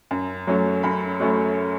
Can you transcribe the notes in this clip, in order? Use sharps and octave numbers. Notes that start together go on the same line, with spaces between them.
F#2
F#3 A3 C#4
F#2 B5
F#3 A3 C#4